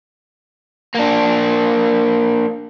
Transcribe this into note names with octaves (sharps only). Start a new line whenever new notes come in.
A#3 D4